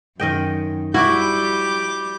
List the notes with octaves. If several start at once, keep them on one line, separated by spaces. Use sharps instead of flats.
F#2 D#3 D#5 G5
G3 E4 F#4 D6 G6